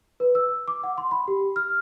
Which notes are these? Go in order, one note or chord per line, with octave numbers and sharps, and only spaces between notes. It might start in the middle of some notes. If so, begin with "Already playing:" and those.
B4
E6
D6
F#5
C6
B5
G4
F6